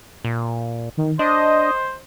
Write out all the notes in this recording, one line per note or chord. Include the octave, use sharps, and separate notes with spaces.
A#2
D#3
D4 C5 D#5